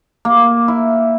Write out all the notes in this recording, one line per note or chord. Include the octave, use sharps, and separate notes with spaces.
A#3
E4